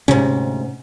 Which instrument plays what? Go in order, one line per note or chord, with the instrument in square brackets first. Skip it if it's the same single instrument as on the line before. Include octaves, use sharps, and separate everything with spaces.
[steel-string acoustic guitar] D2 G#2 [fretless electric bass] C3 C#4